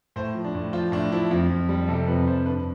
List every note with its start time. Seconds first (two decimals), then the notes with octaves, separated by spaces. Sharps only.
0.16 A2 C5
0.35 F3
0.45 D4
0.55 A2
0.73 F3 F4
0.92 A2 D4
1.12 F3 E4
1.31 F2 F4
1.50 F2
1.69 G3
1.88 C3 A4
2.07 F2 B4
2.27 F2 C5
2.46 G2 B4